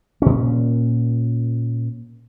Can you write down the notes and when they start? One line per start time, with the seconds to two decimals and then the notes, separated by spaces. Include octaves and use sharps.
0.22 A#2 C#4